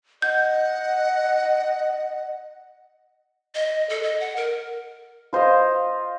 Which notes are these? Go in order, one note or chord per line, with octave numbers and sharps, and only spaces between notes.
D#5 F#5 G6
D#5
A4
D#5
F#5
A#4
F4 C5 D#5 F5